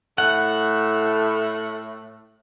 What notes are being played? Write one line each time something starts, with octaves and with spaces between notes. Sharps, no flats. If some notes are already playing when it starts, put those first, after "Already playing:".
A2 A3 F#5